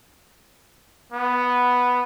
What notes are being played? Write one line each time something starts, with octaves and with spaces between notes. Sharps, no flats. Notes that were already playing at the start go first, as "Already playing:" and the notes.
B3